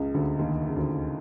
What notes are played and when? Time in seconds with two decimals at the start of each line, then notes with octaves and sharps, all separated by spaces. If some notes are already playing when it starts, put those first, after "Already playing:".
Already playing: C#2 C#3
0.14 D2 D3
0.39 D#2 D#3
0.67 C#3
0.75 D2 D3